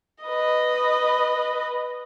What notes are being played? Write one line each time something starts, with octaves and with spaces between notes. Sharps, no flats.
B4 D#5